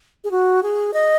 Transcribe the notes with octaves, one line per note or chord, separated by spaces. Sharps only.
G#4
F#4
G#4
D#5